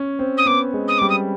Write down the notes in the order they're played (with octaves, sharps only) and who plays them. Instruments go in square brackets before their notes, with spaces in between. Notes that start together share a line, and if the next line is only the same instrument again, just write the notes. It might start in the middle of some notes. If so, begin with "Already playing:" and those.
Already playing: [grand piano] C#4
C4
[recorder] D#6
[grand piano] B3 [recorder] D6
[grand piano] G#3
[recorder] D#6
[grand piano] G3 [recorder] D6
[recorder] D#6